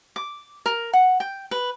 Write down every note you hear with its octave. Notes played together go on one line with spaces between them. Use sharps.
D6
A#4
F#5
G5
B4